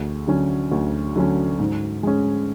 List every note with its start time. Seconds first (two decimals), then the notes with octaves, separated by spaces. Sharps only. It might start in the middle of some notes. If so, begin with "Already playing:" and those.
Already playing: D2 G#4
0.28 D3 F#3 C#4
0.71 D2
1.16 D3 F#3 C#4
1.59 G#2
2.03 G#3 C#4